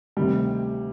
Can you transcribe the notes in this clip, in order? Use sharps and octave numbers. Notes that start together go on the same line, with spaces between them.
D2 C3 D#3 G3